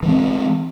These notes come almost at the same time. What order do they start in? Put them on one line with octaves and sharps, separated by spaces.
E3 G#3 C4